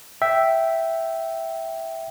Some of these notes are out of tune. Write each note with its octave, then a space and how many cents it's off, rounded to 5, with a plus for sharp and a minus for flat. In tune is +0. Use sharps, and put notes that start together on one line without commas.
E5 +0 G5 -10